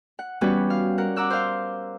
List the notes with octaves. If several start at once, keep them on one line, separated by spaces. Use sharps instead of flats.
F#5
E3 G3 B3 C#4 F#4 B4
F5
A#4 F#5
F#5 A#5 D6 E6 F#6
C5 F5